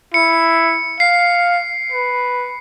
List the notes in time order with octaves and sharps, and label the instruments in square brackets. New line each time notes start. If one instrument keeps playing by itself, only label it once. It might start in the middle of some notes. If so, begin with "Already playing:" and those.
[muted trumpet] E4 [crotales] C#7
[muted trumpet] F5 [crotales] C7
[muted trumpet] B4